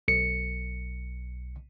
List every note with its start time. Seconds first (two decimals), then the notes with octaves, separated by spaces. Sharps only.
0.08 B1 C#7